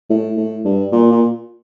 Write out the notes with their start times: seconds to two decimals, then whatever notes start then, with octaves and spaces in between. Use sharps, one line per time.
0.10 A2
0.37 A2
0.65 G2
0.92 A#2
1.12 A#2